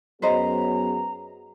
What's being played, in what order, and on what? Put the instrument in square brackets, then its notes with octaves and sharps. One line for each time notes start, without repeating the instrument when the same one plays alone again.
[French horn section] F#2 F#3 G#4 [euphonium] B3 [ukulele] B4 C5 D#5 [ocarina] A#5